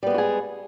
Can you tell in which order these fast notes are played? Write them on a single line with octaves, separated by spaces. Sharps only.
G3 B3 G#3 F#4 G#4